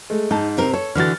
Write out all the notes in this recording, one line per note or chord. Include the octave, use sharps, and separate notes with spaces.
G#3 A3
G#2 D#4 A5
C3 C4 A#4
A4 C#5
D3 E3 F#4 F6 A6